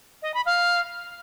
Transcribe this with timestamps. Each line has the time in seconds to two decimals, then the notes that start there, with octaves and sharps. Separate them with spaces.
0.22 D#5
0.34 B5
0.46 F5